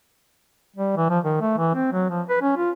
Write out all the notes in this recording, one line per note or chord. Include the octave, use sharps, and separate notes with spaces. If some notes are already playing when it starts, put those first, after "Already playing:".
G3
E3
F3
D#3
A3
E3
C4
F#3
F3
B4
C#4
F4